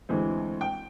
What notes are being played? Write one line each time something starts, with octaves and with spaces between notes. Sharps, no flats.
D2 E3 G#3 C4
G5